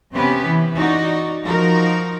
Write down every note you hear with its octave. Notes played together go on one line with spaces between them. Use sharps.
C3 B3 C#4 G4 B4
E3
D#4 F#4 D5
F3 D#4 F#4 A#4